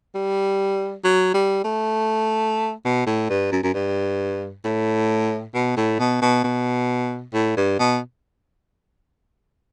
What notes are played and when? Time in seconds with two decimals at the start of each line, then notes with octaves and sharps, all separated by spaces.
0.15 G3
1.04 F#3
1.34 G3
1.64 A3
2.85 B2
3.07 A2
3.30 G2
3.52 F#2
3.63 F#2
3.74 G2
4.65 A2
5.54 B2
5.77 A2
5.99 B2
6.22 B2
6.44 B2
7.34 A2
7.57 G2
7.79 B2